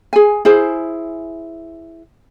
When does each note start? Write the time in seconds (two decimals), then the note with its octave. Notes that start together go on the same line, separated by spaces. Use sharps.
0.13 G#4 G#5
0.45 E4 G#4 C5